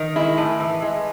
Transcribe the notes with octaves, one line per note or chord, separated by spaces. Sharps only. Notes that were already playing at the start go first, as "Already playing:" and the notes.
Already playing: D#3
G#3 E4
A2
E3
G#3